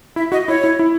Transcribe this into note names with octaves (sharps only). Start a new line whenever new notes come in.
E4 E5
F#4 D#5
E4 C#5
E4
E4